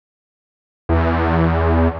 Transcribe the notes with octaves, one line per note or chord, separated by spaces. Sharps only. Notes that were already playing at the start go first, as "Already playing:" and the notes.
E2